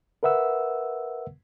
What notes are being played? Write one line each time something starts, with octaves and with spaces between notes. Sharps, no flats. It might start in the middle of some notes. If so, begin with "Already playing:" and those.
A#4 B4 E5 F#5 E6